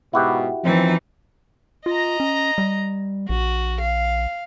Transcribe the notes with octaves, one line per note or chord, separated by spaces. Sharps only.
G#2 B2 E4 F#4 G4
F#2 E3 F3 C4 D#4
F4 D#5 A#5
C#4
G3
A#1 F#4
F5